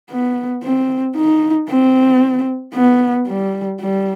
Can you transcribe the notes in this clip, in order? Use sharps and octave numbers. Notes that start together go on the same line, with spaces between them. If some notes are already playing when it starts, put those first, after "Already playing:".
B3
C4
D#4
C4
B3
G3
G3